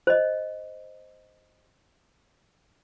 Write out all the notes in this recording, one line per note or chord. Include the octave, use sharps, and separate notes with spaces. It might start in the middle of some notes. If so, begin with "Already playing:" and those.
C5 D#5